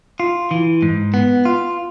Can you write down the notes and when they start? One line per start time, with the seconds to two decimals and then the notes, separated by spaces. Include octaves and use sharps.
0.20 F4
0.51 E3
0.82 G#2
1.14 B3
1.45 F4